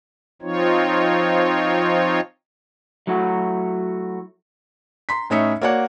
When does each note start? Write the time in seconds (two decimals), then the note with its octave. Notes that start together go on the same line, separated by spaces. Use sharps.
0.42 F3 C4 D#4 F4 C#5
3.07 F#3 A3 E4 F#4
5.09 A#5 C6 B6
5.30 A2 C#4 D#4 E5 C#7
5.61 A#3 F#4 C#5 D5 F#5